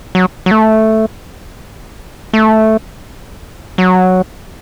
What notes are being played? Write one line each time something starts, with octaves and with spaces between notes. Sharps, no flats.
F#3
F#3
A3
A3
F#3